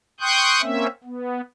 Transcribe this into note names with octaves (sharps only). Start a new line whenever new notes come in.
G5 C6 C#6 D#6 F#6 G6
A#3 C4 C#4 E5
B3